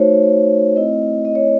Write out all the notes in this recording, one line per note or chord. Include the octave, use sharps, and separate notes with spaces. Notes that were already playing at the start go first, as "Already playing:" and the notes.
Already playing: A3 D#4 F#4 C5 C#5
A3 C4 E4 D#5
D#5
C#5